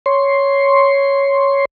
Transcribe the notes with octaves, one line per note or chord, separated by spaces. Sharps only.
C#5 C6